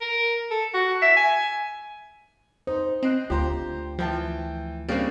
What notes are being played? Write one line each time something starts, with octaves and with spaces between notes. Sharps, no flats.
A#4
A4
F#4
E5
G#5
D#4 C5
C4 D#5 F#6
D2 F4 G4 C5 A#5
E3 F3 G5 A5
C#3 G3 A#3 C4 D4